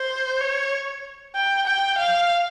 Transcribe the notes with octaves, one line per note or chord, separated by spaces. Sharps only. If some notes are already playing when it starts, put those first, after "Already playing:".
Already playing: C5
C#5
G5
G5
F5